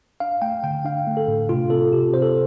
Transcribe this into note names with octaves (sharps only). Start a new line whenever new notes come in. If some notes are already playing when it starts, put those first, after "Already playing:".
D4 F5
A3 G5
D3 G5
D4 F5
A3
A4
A2
C3 F4
C4 A4
C3 G4
C3 C5
A4